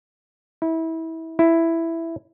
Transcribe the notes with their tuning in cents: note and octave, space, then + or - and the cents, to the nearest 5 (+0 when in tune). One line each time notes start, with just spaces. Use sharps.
E4 -25
E4 +5